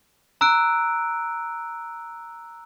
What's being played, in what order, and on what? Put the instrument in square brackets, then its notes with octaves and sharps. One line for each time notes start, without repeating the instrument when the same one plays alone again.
[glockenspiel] A#5 E6 F#6 D7